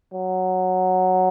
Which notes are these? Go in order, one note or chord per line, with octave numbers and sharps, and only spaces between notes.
F#3